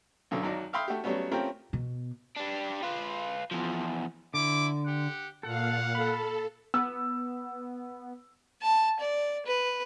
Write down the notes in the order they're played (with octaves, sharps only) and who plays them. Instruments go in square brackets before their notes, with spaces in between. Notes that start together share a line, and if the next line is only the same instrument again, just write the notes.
[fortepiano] B1 F#2 D3
G#1 F#3 D#4 D5
E5 F5 G5 B5 C6 D#6
A3 F#4 G4
F#3 G3 A3 B3 C#4
A3 C4 C#4 F4 G4 A#4
[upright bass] B2
[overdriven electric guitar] G3 D4
F4 B4
E2 F3
[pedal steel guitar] D3 [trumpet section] E4 D6
[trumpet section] G4 F#5
[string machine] A#2 F5 [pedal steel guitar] A4 [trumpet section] F#5
[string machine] A4 [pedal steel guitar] B5
[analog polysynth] B3 [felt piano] E6
[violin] A5
D5
B4